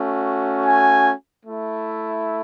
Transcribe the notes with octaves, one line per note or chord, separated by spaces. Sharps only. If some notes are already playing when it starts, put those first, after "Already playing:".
Already playing: A3 C#4 F#4
G#5
A3 E4